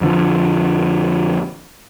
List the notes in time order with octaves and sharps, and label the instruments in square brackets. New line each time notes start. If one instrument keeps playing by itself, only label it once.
[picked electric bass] F2 D3 F3